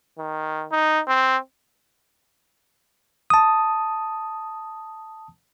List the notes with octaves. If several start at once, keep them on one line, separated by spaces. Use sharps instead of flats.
D#3
D#4
C4
A5 D#6